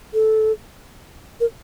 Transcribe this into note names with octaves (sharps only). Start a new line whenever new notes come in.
A4
A#4